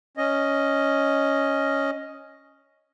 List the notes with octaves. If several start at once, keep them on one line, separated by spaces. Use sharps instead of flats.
C#4 D#5